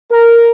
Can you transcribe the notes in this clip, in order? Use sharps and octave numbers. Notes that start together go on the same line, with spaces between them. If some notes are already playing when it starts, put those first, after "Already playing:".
A#4